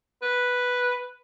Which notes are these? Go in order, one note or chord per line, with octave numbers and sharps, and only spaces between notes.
B4